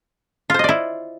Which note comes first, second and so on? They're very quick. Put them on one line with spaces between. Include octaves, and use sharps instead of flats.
F4 C5 D#5 D5 E4